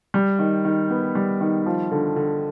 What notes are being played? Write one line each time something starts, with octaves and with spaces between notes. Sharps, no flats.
G3
D#3
D#3
B3
G3
D#3
F3
D3
D3